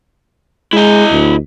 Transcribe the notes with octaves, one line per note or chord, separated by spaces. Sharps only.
G#3 E4 D#5
D2